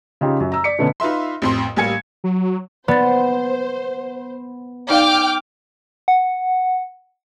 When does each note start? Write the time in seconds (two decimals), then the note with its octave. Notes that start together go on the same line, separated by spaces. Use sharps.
0.21 C#3 D#4 F4 G4
0.40 F#2
0.52 A#5 E6
0.64 D5 B6 C#7
0.78 B2 D3 A3 B3 C#4
1.00 D#4 F4 B4 E5 C6
1.42 A1 F2 C6
1.76 A1 G3 A#3 G#5 G#6 C#7
2.24 F#3
2.88 B3 C5 D5 A6
4.90 D#4 D5 F5 G5 D6 F6
6.08 F#5